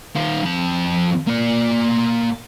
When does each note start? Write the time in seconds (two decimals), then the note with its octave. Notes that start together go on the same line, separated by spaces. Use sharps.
0.15 D#3 F4
0.45 F2 A5
1.27 A#3 D5